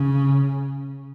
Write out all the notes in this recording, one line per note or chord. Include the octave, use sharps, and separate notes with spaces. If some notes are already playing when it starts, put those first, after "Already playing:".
Already playing: C#3